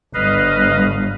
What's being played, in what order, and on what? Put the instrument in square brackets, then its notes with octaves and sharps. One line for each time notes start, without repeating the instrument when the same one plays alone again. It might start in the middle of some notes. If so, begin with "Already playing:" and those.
[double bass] G1 [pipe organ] B4 D#5 F5